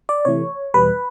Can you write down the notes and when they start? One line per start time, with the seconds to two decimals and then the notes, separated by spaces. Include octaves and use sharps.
0.09 D5
0.25 C3 E3 A3 C#5
0.74 E2 B2 G3 B4